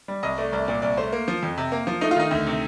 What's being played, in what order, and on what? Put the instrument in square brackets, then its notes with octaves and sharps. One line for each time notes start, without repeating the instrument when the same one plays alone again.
[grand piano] G3
C2 D#5
A3 D5
C2 D5
A#2 D5
C2 D5
A3 C5
A#3
F3
F2
C3
A#3
F3
A3 D#4
F4
D#3 D#4
D2
C3